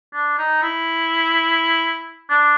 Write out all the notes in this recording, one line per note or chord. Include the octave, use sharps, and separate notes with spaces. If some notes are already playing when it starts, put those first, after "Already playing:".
D4
D#4
E4
D4